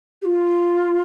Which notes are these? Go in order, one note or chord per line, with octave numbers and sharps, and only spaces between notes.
G4
F4